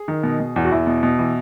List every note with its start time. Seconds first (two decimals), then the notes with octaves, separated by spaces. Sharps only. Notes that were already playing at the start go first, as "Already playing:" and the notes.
Already playing: G#4
0.08 D#3
0.23 B2
0.40 B2
0.56 E2
0.65 F#4
0.72 E2 E4
0.87 B2
1.03 B2
1.19 E3